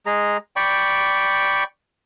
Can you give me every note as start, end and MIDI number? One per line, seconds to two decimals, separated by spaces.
0.06 0.37 56
0.06 0.37 68
0.06 0.37 82
0.56 1.64 74
0.56 1.64 79
0.56 1.64 83
0.56 1.64 85